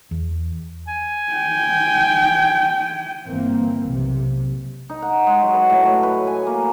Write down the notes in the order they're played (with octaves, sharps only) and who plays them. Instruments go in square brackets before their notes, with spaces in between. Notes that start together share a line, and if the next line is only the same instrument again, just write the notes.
[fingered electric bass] E2
[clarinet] G#5
[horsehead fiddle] G5
[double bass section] G1 E3 A#3 C4
B1 C3
[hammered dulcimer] D#4
F#5
G#3
F#3
B4
A2
C#5
B4
G#5
A#3